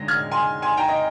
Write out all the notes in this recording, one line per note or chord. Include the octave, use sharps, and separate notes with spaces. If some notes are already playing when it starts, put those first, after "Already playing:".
Already playing: D3 G#3 A#6
F6 G#6
G#5 C6
G#5 C6
G5 A#5
D#5